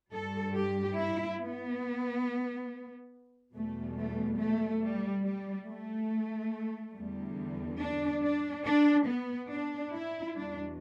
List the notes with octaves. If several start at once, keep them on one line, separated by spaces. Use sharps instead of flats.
G2 G3 A4
G4
E4
B3
E2 B2 G3 A3
A3
A3
G3
G3
A3
E2 D3 G3
D4
D4
D4
B3
D4
E4
E2 B2 G3 D4